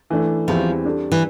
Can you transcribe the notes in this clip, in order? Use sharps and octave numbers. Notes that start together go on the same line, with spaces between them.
E3 A3 D4
E2 E3 F3 G3 C4 E4
G3 D4 A4
E3